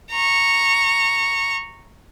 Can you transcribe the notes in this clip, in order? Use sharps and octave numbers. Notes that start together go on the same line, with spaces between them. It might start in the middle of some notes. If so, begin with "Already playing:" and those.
A#5 C#6